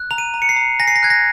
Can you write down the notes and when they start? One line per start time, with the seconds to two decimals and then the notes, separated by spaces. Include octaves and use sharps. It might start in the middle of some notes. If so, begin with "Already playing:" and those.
Already playing: F#6
0.11 A#5 F7
0.18 D#7
0.34 A#5
0.42 C#7
0.49 C7
0.56 A#5
0.80 G#5 A#6
0.87 C7
0.96 A#6
1.03 F#6 G#6
1.10 A#6